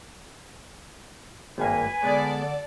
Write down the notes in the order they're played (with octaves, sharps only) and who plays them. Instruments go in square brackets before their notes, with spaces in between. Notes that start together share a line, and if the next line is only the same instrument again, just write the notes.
[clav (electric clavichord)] G#1 G2 A#3 [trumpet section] B4 G#5
[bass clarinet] D3 [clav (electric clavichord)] G#3 B3 [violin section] A4 D5